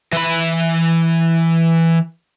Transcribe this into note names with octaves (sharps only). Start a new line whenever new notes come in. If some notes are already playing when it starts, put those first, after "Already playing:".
E3 B5